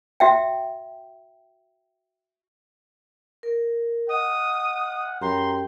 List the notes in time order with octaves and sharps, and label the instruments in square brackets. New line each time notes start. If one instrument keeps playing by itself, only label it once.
[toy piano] F#4 E5 G5
[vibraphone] A#4
[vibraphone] D#5 [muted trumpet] F#5 [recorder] D#6
[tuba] F#2 [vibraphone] G4 G5 [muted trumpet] A#5 [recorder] C6